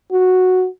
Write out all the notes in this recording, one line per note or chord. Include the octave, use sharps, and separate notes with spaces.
F#4